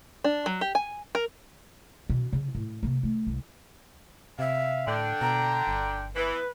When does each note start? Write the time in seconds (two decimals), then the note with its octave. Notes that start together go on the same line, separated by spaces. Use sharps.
0.24 D4
0.46 F#3
0.61 G4
0.75 G#5
1.15 A#4
2.10 B2 C#4
2.33 C#3
2.55 A2
2.83 C3 A#3
3.03 A3
3.27 C2
4.39 C3 E5 F5
4.87 A2 D3 D4 G5
5.21 B2 A#5
5.67 G1
6.16 E3 B3 B4